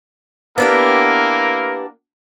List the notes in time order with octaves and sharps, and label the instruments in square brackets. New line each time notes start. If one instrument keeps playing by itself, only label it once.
[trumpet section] A#3 E4 A#4 [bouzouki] B3 D4 G4